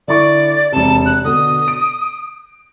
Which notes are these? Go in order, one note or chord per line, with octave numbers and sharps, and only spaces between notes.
D3 E4 D5 C#6
E1 C3 A5
F#6
B2 D3 D#6
D7